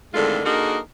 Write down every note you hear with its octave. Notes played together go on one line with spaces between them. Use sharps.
F2 A2 D3 D#3 G#3 F4
D3 A#3 D#4 F#4 G#4 A#4